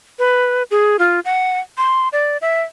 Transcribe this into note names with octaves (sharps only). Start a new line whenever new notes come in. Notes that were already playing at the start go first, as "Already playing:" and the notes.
B4
G#4
F4
F#5
C6
D5
E5